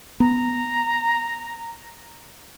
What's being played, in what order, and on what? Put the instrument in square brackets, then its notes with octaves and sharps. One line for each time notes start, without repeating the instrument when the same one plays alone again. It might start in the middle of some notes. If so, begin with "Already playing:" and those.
[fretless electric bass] B3 [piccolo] A#5